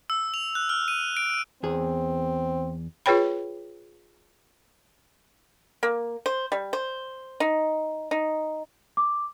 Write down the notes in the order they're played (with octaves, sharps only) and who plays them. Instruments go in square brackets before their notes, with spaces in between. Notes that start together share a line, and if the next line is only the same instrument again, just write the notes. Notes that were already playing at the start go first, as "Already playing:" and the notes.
[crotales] E6
F7
F#6
F6
D#7
D7
[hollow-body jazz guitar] E2 G#4 [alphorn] C4
[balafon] F4 G#4 B4 C#5 G5 B5
[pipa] A#3
C5
G3
C5
D#4
D#4
[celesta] D6